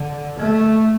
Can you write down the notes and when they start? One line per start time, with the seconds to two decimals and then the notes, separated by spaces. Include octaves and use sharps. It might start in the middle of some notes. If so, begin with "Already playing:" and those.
Already playing: D3
0.39 A3